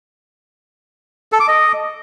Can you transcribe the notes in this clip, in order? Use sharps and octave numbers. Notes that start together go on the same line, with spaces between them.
A4
D6
D#5